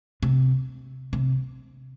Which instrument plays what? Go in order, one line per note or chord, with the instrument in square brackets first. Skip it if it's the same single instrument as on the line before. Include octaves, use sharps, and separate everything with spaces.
[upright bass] C3
C3